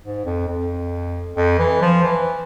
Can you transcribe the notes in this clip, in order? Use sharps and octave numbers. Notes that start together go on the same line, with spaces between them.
G#2
F2
F2
F2
E3
F3
E3